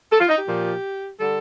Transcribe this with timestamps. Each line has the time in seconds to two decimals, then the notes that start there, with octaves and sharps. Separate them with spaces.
0.13 A4
0.20 F4
0.29 D#4
0.39 G4
0.48 A#2 F3
1.19 D3 G3 A4